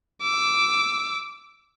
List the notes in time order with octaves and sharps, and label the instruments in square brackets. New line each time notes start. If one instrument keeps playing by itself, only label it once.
[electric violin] D6 E6